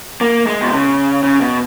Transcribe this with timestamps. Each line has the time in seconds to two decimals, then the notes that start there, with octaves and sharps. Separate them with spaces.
0.21 A#3
0.47 G#3
0.62 B2
0.73 C#3
1.23 C#3
1.41 B2